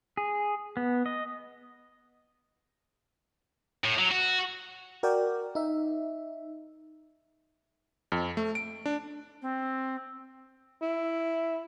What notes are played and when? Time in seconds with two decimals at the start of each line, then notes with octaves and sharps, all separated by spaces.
0.17 G#4
0.77 B3
1.06 D#5
3.84 A2
3.99 F#3
4.11 F#4
5.03 F#4 A#4 D5 G5
5.55 D#4 E5
8.12 F2
8.37 A3
8.55 D7
8.86 D4
9.42 C4
10.81 E4